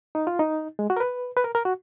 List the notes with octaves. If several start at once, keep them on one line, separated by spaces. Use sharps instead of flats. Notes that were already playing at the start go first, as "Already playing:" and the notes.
D#4
F4
D#4
G#3
F#4
A#4
B4
B4
A#4
A#4
F#4